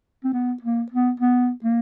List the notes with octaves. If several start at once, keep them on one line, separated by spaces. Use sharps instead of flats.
C4
B3
A#3
B3
B3
A#3